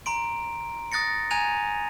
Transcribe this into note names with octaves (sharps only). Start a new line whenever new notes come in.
A#5 C6 D7
D#6 F#6 A6 A#6 C#7
G#5 A#5 F#6 G#6 D#7 F7